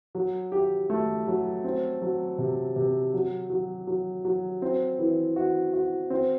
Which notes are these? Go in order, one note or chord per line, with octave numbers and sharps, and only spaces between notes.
F#3
G4
A3
F#3
C4
F#3
C3
C3
F#3
F#3
F#3
F#3
C4
E3
F#4
F#4
C4